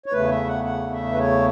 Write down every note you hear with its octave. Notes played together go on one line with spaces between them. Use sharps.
C#5
E2 C#3 A3 B4
C#5
E5
F#5
F#5
E5
B4
C#5